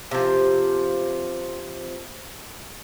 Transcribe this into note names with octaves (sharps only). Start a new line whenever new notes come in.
C3 F3